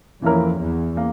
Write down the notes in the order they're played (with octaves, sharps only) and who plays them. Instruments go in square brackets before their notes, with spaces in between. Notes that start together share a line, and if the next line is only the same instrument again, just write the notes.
[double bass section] F2 [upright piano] E3 A#3 C#4 E4 A#4
[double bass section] E2
[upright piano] A#3